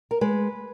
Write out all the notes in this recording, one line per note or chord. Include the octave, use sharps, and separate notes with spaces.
A#4
G#3 B4